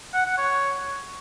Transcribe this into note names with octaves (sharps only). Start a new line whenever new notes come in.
F#5
F#5
C#5